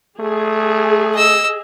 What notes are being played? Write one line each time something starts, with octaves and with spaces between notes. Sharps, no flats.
A3 G#4
D#5 E6